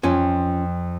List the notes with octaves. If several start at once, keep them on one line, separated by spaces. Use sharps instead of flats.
F2 C#4 F4 G#5